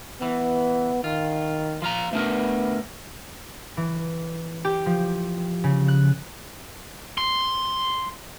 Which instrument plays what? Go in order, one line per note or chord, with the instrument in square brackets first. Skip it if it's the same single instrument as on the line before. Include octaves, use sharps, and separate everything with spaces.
[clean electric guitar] E3 [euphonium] B3
[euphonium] D#3 [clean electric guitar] F4
[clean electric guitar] F3 F4 A#5
[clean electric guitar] A3 D4 A#4 [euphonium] B3
[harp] E3
G4
F3
C#3
F#6
[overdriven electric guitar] C6